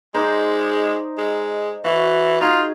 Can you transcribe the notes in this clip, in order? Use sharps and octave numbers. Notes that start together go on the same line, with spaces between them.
G#3 D#4 C5 D5
G#3
E3 F#4
D#4 F4 G#4